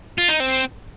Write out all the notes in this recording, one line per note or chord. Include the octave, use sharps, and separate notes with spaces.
F4
D#4
C4